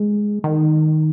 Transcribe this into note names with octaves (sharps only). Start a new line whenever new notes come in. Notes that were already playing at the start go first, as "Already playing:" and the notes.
Already playing: G#3
D#3